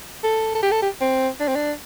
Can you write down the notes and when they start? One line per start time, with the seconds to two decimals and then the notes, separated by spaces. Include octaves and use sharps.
0.24 A4
0.55 A4
0.62 G4
0.71 A4
0.82 G4
1.01 C4
1.40 D4
1.48 C4
1.55 D4